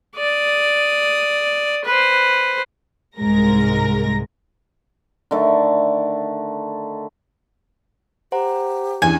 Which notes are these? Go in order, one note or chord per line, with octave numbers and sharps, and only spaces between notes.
D5 D#6
B4 C5
C2 G#2 G#3 A#4 A#6
D3 D#3 A3
G4 C5 F#5 A#5
E2 C#4 D4 G#4 G#5